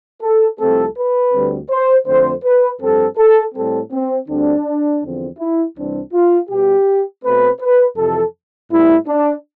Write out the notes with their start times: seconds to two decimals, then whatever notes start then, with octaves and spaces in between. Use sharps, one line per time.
0.22 A4
0.60 C2 C3 F3 A3 C4 A4
0.97 B4
1.33 D2 D3 G3 C4
1.70 C5
2.07 F2 D3 A3 C4 C5
2.44 B4
2.81 G2 F3 C4 A4
3.18 A4
3.54 A2 G3 C4 A4
3.92 C4
4.28 D2 D3 G3 C4 D4
5.03 E2 D3 F3 C4
5.39 E4
5.76 C2 C3 E3 G3 C4 D4
6.13 F4
6.49 B2 G3 B3 G4
7.24 B2 A3 C4 B4
7.61 B4
7.97 F2 C3 E3 A4
8.71 A2 G3 B3 E4
9.08 D4